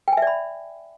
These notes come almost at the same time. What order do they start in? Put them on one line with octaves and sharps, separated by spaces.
G5 G#5 E5 D5 B5